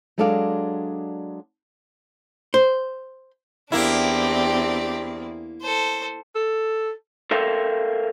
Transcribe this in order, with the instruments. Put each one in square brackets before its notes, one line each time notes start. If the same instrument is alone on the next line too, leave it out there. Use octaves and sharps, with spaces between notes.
[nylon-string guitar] F#3 G#3 D4 A4 D5 F5
[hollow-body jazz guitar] C5
[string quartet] E2 C4 D5 [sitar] A#3 E4 [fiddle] D4 G4
[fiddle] A4 C5
[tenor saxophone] A4
[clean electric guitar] A4 A#4 C5 E5 F5 G5